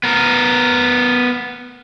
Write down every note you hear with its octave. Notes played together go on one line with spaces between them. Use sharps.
B3 A#4